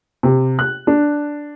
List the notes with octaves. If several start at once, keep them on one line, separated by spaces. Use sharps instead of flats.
C3
F#6
D4